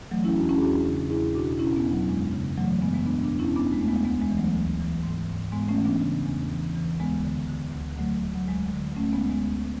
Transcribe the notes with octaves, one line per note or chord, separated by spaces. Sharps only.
E3 F#3 A3
C#4 E4
E2 D4 F#4
C#4 E4
G#4
E2 D4 F#4
C#3
E2 E4 G#4
B2 D4 F#4
B2 C#4 E4
B3 D4
E2
F#3
F#2 G#3
C#3
E3 F#3 A3
F#3 A3
F#2 G#3 B3
G#3 B3
B2 B3 D4
B3 D4
E2
C#4 E4
E2 B3 D4
G#3
E2 A3
G#3 B3
D2 G#3 B3
G#3
E3
F#3 A3
D2
E3
G#2
G#2
G#2 G#3 B3
A3 C#4
E3
B3 D4
C#3
E2
E3
E3
D2 G#3 B3
D3
D3
D2
D3 F#3 A3
D2
F#3
D2 G#3
D3
D2 A3 C#4
G#3 B3
D2
G#3 B3
D2